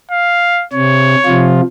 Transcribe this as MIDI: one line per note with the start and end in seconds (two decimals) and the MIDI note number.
0.11 0.65 77
0.73 1.15 48
0.73 1.52 73
1.26 1.61 48
1.26 1.61 53
1.26 1.61 65